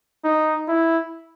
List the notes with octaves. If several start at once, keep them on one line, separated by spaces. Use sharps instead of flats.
D#4
E4